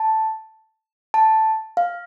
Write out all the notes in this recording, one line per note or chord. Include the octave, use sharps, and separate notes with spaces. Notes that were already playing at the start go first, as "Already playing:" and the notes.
Already playing: A5
A5
F5